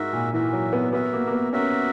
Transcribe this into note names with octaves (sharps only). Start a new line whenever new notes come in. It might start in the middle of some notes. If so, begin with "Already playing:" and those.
Already playing: G#2 F#4 A#4 E5
A#2
E3 F#4 A#4 E5
F#3
B3
B3 F#4 A#4 E5
A#3
A#3
B3
C#4 F#4 A#4 E5